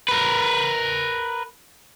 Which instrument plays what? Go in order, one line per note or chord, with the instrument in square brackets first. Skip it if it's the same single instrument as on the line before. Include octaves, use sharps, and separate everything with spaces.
[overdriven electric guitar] A#4 B4